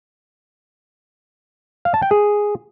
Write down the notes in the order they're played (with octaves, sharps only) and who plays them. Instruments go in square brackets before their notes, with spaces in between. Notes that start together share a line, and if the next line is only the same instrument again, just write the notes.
[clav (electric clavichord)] F5
A5
G5
G#4